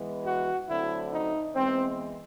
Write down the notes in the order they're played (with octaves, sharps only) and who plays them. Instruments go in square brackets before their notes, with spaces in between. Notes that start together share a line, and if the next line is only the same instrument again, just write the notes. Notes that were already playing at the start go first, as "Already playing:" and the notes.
Already playing: [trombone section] E3 G#3 B3
F#4
D3 F#3 A3 C4 E4
D#4
E3 G#3 B3 C4